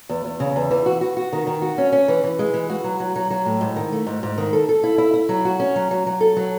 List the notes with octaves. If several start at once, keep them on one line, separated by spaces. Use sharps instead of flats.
E2
E2
C#3
E2
E3
F#4
F#4
F#4
D#3
D#3
F#4
C#4
C#4
E3
E3
G#3
E3
F#4
F#3
F#3
F#3
F#3
A2
G#2
D#3
A3
G#2
G#2
D#3
A4
A4
E4
E4
E4
F#3
F#4
C#4
F#3
F#3
F#3
A4
F#3